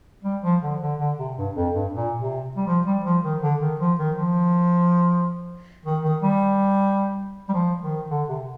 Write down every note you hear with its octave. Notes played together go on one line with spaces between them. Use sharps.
G3
F3
D3
D3
D3
C3
G2
F2
G2
A#2
C3
G3
F3
G3
F3
D#3
D3
D#3
F3
D#3
F3
D#3
D#3
G3
G3
F3
D#3
D3
C3